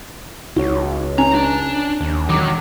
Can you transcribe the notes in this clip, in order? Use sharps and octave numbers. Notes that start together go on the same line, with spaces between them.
C#2 F#4 C#5
C#4 G#5 A#5
D4
D#2
E1 D#3 F#3 D6